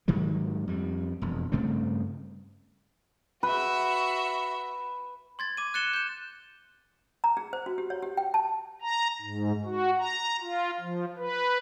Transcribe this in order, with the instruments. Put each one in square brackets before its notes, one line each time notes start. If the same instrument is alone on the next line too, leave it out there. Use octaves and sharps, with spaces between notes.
[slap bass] G#2 D#3 F#3 G3
F2 G3
E1 F2
G2 C#3 A3 C4
[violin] F#4 E5 [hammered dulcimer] B4
[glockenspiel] C6 G#6 A6
D6 D#7
F#6 A6 C#7 E7 G7
G6 E7
[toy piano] A#5
G#4
C5
F#4
G4
C#5
G4
G5
A5
[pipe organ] A#5
G#2
F#4
A#5
F4
F3
B4